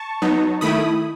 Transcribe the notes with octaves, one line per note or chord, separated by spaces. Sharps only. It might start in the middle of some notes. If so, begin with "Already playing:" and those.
Already playing: A5 C#6
F#3 B3 D#4
D#3 A3 E4 B5 D#6